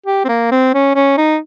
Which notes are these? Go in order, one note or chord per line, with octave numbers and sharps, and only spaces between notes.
G4
C4
A#3
C4
C#4
C#4
D#4